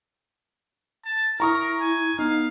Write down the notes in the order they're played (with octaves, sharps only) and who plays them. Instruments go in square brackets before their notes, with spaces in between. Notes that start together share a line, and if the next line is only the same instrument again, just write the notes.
[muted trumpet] A5
[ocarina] E4 [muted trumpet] A#4 [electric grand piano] A#5 C#6 D#6
[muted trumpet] G#5
[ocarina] B3 [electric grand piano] D#4 [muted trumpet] F5